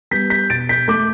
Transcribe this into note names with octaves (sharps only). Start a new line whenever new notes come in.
G3 B3 G6 B6
G6 B6
B2 A6 D7
G6 B6
A3 D6 G6